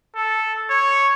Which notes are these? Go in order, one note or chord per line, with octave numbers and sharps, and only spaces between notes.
A4
C#5